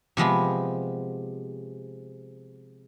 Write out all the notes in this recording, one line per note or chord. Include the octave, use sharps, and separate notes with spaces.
C3 F3 G#3 B3